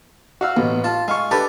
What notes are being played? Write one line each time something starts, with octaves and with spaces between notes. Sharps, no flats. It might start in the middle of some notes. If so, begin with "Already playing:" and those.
F#4 F5 E6
A1 B2
F4 A5
G#3 F5 C#6
D4 G4 A4 B4